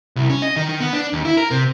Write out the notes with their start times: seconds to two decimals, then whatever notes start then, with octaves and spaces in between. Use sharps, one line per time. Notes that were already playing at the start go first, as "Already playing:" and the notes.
0.16 C2
0.30 C#4
0.42 D#5
0.56 D#3
0.69 D#3
0.80 B3
0.93 D4
1.13 D#2
1.25 E4
1.37 A#4
1.51 C3